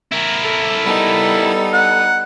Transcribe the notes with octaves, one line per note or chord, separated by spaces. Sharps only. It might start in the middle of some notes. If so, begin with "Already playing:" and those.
E4 A#4
A4
G3 B3 D#4
F#5